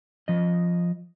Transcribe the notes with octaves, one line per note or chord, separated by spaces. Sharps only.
F3 D#5